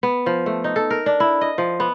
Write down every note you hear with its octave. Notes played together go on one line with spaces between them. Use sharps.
B3
F3
A3
D#4
A4
A#4
D4
E4
D#5
F3
B3